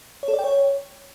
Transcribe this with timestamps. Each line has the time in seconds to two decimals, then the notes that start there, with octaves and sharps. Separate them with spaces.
0.23 C#5
0.28 A4
0.33 D5
0.39 G5
0.44 C#5